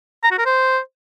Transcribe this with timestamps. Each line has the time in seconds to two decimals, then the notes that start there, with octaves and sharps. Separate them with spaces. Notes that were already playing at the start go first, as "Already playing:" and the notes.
0.24 A#5
0.31 F#4
0.38 A#4
0.46 C5